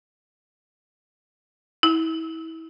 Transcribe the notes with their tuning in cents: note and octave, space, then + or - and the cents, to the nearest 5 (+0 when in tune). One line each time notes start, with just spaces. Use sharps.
E4 -30